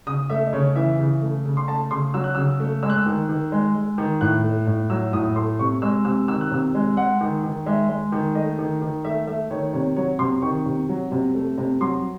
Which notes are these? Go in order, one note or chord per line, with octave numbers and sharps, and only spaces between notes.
C#3 D#6
A3 E5
D#5
C#3 C#5
E3 E5
C#3
A3
C#3
C6
A3 A5
C#3 C6
F#3 E6
F#6
C#3 E6
A3
G#3 E6
F#6
E6
D#3
D#3
G#3
G#3
D#3
A2 F#6
A3
A2
F#3 E6
A2 D#6
A3 C6
C3 C#6
G#3 E6
C3 E6
D#3 E6
F#6
C3 E6
G#3
G#3 F#5
D#3
D#3
G#3 E5
G#3
D#3
A3 D#5
D#3
D#3
A3 E5
A3 E5
D#3 C#5
C3 C#5
F#3 C#5
C3 C6
D#3 C#6
C3
F#3
C3
A3
C3
F#3 C6